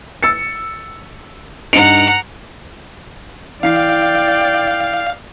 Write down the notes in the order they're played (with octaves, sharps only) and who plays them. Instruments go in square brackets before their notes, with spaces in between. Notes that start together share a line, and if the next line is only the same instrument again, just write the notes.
[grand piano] E6 A6 C#7
[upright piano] G2 D#4 [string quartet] F#5 A#5 [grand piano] C#7 D7 F7
[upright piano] E3 C7 [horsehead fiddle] D5 G5 [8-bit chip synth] F5